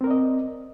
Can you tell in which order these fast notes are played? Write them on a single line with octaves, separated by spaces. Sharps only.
C4 A#4 D5 D#5